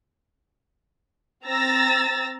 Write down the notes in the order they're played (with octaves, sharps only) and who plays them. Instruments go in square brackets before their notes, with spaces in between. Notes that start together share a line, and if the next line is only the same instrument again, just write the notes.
[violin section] C4 A#5 E6 A6 A#6